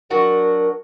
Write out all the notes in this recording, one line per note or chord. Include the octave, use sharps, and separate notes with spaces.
F#3 D4 F#4 A#4